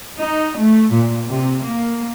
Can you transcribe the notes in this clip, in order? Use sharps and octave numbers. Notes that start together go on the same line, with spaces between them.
D#4
A3
A#2
C3
A#3